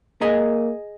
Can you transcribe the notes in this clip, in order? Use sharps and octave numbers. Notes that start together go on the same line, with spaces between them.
A#3 G#4 D#5 A#5